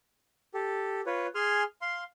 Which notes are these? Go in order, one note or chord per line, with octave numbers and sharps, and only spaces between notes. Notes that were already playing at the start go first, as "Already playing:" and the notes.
G4 A4
F4 B4 C#5
G#4 G#5 C6 F6
F5 C6